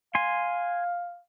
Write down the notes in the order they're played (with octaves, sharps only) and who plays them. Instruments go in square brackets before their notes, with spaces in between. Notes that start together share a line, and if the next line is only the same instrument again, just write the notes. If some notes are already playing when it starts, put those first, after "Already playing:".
[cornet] F5 [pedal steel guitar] G#5 C6